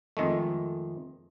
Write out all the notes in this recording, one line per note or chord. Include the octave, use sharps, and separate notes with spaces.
F2 D#3 G#3 A3